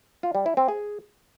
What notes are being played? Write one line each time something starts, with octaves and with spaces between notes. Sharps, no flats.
F4
G3
E4
C4
G#4